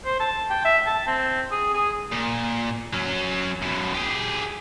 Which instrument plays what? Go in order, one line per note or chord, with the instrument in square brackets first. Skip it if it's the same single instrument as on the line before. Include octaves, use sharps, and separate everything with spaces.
[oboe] C5
A5
G5
E5
A5
C4
G#4
G#4
[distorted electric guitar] A#2
F#3 C#4
F#2 B2
G4 G#4